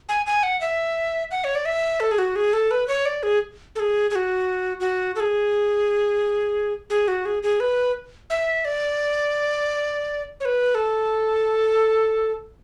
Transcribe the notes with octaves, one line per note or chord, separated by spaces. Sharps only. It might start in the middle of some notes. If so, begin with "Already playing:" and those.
G#5
G#5
F#5
E5
F#5
C#5
D5
E5
A4
G#4
F#4
G#4
A4
B4
C#5
D5
G#4
A4
G#4
G#4
F#4
F#4
A4
G#4
G#4
F#4
G#4
G#4
B4
E5
D5
C#5
B4
A4